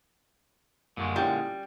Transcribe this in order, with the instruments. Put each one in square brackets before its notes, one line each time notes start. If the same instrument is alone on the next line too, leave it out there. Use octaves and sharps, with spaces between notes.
[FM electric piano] F#2 G3 C#6 [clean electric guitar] A#2 D3 G#3
[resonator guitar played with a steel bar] G3 [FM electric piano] C#4 E4 F4